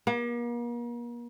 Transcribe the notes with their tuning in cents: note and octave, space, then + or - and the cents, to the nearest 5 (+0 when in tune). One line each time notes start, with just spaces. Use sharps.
A#3 +40